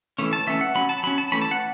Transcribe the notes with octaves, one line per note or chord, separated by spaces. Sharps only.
E3 A3 C#4
A5
E3 A3 C#4 E5
F#5
F#3 C#4 B5
A5
F#3 C#4 B5
A5
E3 A3 C#4 B5
A5
F#5